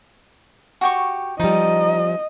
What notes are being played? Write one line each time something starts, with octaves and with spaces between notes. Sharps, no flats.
F#4 G4 C#6
F3 G3 D#4 D#5